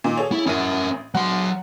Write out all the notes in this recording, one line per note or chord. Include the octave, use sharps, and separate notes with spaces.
A#2 D#3
G#4 A4 C#5
E4
A1 C#4 E4 A#4 D#7
F#3 F#5 C6